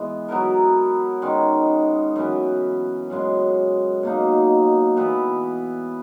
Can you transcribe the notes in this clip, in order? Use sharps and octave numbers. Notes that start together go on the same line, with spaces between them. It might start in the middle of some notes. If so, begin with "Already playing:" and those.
Already playing: E3 G#3 B3
F#3 B3 E4 A#4
D#3 G#3 C#4
F#2 E3 B3
F#2 C#3 G#3
B2 A#3 D#4
E3 B3 E4